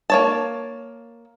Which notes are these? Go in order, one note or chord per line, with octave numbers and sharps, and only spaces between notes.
A#3 C#5 A5